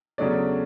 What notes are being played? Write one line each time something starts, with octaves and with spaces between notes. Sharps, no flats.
E2 C#3 F#3 A3 C#4 D4 D5